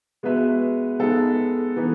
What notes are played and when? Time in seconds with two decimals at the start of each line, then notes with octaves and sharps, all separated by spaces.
0.23 G#3 B3 F#4 B4 E5
0.99 G#3 B3 D#4 A4
1.76 E3 B3 D#4